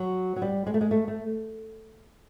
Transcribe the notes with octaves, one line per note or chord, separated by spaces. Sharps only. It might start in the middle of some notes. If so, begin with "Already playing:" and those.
Already playing: F#3
F#3
G3
G#3
A3
G#3
A3
A3